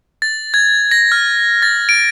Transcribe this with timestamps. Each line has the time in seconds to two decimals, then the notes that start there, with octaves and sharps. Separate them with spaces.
0.22 A6
0.54 G#6
0.91 A#6
1.12 F6
1.62 A6
1.89 D7